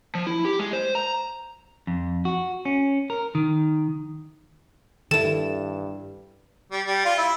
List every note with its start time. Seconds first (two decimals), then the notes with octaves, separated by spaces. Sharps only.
0.15 F3
0.27 E4
0.45 G4
0.59 G#3
0.73 C5
0.95 A#5
1.87 F2
2.25 F#4
2.65 C#4
3.10 A#4
3.35 D#3
5.11 G2 D#3 E4 A4 E7
6.72 G3
6.86 G3
7.05 F4
7.18 E4